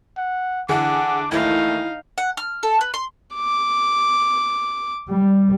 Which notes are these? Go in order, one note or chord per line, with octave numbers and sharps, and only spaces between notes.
F#5
D3 E3 D4 G#4 F#5 D6
D#2 E3 A3 D#4 E4 F5
F#5
F6
A4
B4
C6
D6
G3